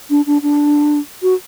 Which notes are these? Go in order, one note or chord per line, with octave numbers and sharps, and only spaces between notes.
D4
D4
D4
F#4